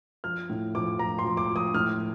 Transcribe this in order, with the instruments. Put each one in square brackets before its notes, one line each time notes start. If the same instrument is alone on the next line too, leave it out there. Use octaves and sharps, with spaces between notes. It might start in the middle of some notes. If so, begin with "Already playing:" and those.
[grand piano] F3 F6
A2
F3 D6
F3 A#5
C6
F3
D6
F3
D#6
A2 F6